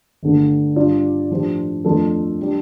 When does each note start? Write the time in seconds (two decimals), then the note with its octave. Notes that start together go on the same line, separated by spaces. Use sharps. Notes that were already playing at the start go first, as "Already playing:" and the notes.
0.23 G1 G2 D3 A3
0.76 G2 G3 D4 F4 D5
1.30 A2 F3 D4 G4 C5
1.85 F2 F3 A3 D4 A4
2.42 G3 D4